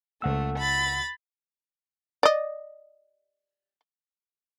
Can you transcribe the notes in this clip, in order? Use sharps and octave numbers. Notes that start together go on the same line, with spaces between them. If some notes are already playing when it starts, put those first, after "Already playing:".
C#2 A3 F#5 E6
B5 A6
D5 D#5